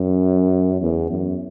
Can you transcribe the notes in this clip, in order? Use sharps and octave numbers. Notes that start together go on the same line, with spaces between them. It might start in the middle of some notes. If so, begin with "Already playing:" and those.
Already playing: F#2
E2
F#2